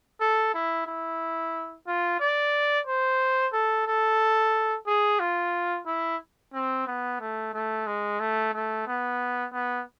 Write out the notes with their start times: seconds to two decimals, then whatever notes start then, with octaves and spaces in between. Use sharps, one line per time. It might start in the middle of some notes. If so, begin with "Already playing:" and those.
0.21 A4
0.54 E4
0.87 E4
1.88 F4
2.20 D5
2.87 C5
3.53 A4
3.87 A4
4.87 G#4
5.20 F4
5.87 E4
6.54 C4
6.87 B3
7.21 A3
7.54 A3
7.87 G#3
8.20 A3
8.54 A3
8.87 B3
9.53 B3